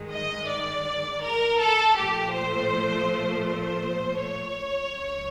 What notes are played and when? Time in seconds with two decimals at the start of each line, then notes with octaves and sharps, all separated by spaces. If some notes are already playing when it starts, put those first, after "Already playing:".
Already playing: G2 D#3 G#3
0.10 D#5
0.48 D5
1.22 A#4
1.59 A4
1.96 A#2 F3 A3 G4
2.33 C5
3.45 C5
4.20 C#5
4.94 C#2 C#3 F#3